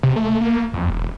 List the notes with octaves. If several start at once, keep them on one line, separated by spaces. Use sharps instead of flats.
C3
A3
A#3
F2
E1